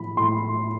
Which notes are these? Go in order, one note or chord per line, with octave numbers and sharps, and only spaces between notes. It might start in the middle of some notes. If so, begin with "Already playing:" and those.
Already playing: A2 F3 B5
A2 C6